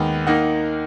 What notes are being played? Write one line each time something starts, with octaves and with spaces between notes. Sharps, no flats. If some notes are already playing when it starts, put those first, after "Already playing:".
Already playing: D#2 D#3 G#3 B3
D#3 A#3 D#4 F#5